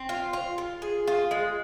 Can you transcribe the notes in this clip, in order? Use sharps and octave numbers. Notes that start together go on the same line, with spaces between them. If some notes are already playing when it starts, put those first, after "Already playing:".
Already playing: C4
F4
F4
F4
G#4
F4
G#3